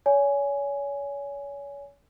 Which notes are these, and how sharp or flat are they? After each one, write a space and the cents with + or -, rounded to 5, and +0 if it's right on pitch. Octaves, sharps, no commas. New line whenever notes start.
C#5 +35 G#5 +0